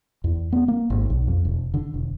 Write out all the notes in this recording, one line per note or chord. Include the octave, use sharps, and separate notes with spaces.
E2
B3
A#3
G#1
B1
F2
E1
D3
E1